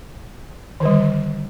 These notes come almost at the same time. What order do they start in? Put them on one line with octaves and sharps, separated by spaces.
D#3 D3 G3